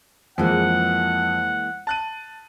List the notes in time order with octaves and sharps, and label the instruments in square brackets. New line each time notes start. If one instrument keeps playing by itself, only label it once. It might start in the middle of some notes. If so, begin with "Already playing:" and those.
[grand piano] F2 [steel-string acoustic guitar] E3 G#3 A#3 [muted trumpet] F#5
[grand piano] A5 F#6 D#7